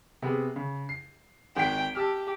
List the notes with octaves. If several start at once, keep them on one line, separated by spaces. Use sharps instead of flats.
C3 B3 G#4
C#3
C7
G#1 F#5 G5 B6
G4 A5 E6 F6